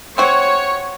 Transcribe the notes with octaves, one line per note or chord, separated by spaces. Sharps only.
C4 F#4 C#5